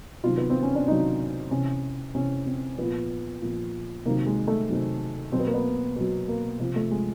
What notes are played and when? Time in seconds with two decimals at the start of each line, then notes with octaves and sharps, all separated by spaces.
0.24 C3 D#3 F#3 F4
0.38 B3
0.50 C4
0.63 C#4
0.75 D4
0.87 C3 D#3 F#3 D#4
1.51 C3 E3 C#4
2.15 C3 E3 C#4
2.46 C4
2.78 A#2 F3 B3
3.42 A#2 F3
4.05 C3 D#3 F#3 A#3
4.26 G#3
4.47 A3
4.69 C3 D#3 F#3
5.32 B2 F#3 C4
5.40 B3
5.47 A#3
5.54 B3
5.96 B2 F#3
6.28 A#3
6.60 C3 F3
6.76 A3
6.91 G#3